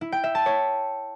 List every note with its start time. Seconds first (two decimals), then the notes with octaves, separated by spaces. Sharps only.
0.01 E4
0.12 G5
0.24 E5
0.35 A5
0.46 C#5